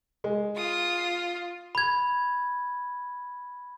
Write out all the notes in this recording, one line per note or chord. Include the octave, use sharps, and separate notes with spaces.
G#3
F4 D#6
B5 G#6